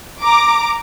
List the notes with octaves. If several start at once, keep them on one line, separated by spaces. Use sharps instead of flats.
A#5 D6